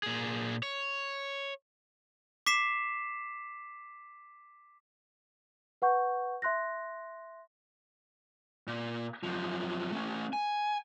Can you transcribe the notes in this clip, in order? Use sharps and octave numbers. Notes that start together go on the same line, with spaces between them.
A#2 G#4
C#5
D6 B6 C7 E7
B4 F#5 C#6 G6
E5 C6 F#6 A#6
A#2
F#2 F3
A3 C#4
G#5